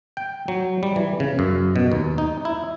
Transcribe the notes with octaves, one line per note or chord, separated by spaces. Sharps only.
G5
F#3
G3
E3
C#3
F#2
B2
D#2
D#4
E4